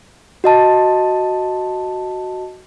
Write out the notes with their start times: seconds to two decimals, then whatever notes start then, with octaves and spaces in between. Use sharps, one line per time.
0.44 F#4 D#5 A5